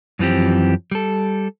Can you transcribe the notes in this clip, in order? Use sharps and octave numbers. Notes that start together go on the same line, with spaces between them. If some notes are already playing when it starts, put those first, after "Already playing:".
F#2 E3 F3 C4 G4
G3 A4